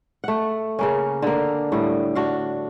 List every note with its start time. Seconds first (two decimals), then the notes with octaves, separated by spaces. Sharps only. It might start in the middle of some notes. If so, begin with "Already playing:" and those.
0.24 A3 F#5
0.79 C#3 A#3 C#4
1.22 D3 A#3
1.72 A2 G3
2.15 D4 F#4 F5